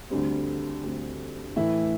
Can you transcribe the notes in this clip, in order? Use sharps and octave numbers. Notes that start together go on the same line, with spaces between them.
D2 D3 G3 C4
D2 D3 G3 C4
A2 E3 A3 E4